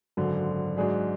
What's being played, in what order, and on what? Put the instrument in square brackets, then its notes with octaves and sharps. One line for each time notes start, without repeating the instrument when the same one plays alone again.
[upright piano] G#1 F#2 D3 F#3
G#2 F#3 D4 G#4